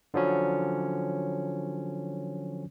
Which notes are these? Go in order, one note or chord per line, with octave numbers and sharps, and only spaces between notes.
D3 F3 F#3 C#4